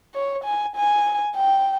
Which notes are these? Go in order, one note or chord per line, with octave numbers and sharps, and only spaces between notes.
C#5
G#5
G#5
G5